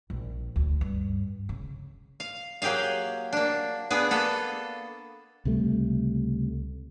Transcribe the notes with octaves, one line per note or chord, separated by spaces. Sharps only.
A#1
D2
G2
C#3
F5
F#3 A#3 G4 G#4 F5
A#3 D4
B3 D4 G#4
A#3 B3 A4
C#2 C3 G3 A3